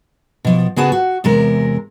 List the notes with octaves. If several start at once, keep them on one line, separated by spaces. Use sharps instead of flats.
B2 F3
C#3 B3 F#4 G#4 B4 A5
F#4
E2 C3 G#3 A#4